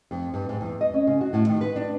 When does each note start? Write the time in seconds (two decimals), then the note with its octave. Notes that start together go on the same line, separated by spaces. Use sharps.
0.11 F2
0.34 G2
0.49 G#2
0.61 E2
0.81 D#5
0.94 C#4
1.07 C#3
1.21 F#4
1.33 A2
1.49 D#3
1.61 B4
1.76 D4